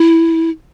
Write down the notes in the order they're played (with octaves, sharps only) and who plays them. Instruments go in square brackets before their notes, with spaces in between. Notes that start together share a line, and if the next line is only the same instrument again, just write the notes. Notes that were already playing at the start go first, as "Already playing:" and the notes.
Already playing: [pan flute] E4